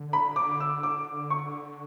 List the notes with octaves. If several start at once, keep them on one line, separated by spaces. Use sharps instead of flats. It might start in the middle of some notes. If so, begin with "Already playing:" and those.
Already playing: D3
B5
D6
E6
D6
C#6